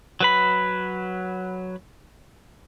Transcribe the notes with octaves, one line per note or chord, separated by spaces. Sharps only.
F#3 B4 B5